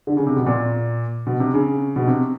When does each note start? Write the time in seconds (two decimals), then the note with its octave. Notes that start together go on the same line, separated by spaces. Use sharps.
0.07 D3
0.17 C#3
0.26 C3
0.36 B2
0.46 A#2
1.27 B2
1.40 C3
1.54 C#3
1.96 B2
2.07 C3